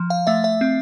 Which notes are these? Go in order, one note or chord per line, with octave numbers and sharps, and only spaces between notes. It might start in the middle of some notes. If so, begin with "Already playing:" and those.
Already playing: F3
F5
A3 E5
E5
C4